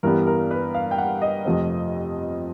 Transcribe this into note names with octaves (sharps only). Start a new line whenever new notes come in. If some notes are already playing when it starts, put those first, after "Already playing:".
G2 E3 G3 B3 A#4
A#4
B4
F5
G5
F#5
D#5
F2 C3 F3 A3 C4